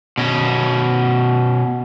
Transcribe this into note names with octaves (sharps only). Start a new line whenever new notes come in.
B2 C#4